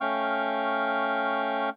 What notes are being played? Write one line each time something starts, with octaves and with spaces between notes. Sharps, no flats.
A3 C#4 F5 G5 C#6 F6